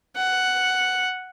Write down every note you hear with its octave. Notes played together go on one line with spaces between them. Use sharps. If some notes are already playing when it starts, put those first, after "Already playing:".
F#5